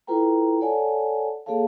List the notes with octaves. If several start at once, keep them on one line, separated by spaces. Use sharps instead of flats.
E4 F4 A4 B4 G5 A#5
A4 C#5 D5 F#5 G#5 A5
A#3 G#4 A4 C#5 F5 A5